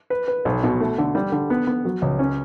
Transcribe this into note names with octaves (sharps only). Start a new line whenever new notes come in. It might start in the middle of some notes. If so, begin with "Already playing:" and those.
B4
B4
B1
B2
A3
D3
G3
D3
B3
B3
F#3
C#2
C#4